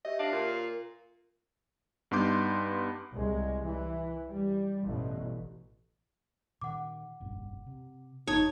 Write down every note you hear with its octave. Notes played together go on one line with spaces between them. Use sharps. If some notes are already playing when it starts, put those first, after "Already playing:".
G4 C#5 D#5 E5
D4 F5 A#6 C7
A#2
A#4
G2 B3 D#4 C6 D6 G6
C2 G#3
E3
G3
A1 G2 B2
A#2 D#3 F#5 D6
F1 A#1 G2
C3
G1 F2 A2 D#4 C#5 A5 D#6